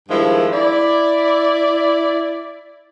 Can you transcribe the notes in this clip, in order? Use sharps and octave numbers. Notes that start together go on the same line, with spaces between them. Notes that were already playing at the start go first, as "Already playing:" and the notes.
G2 D#3 F3 G#3 E4
E4 D5